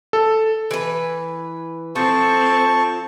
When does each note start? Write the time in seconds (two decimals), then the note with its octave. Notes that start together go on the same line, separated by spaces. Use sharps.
0.13 A4
0.71 E3 B4
1.96 F3 C4 A4 A5 C#6